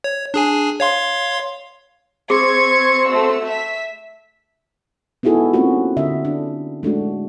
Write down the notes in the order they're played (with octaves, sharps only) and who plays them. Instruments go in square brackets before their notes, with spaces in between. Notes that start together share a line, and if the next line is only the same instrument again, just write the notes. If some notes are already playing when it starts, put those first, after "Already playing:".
[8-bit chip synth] C#5
D4 G#4 G#5
C#5 F5 C6
[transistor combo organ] C4 [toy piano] G#4 [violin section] C#6 G#6
[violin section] A3 F#4 E6
E5 B6
[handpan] B3 D#4 E4 F#4 G#4 A4
A#3 C4 C#4 F4 F#4
D3 D4 D#5 E5
D4
G#3 A3 D4 F#4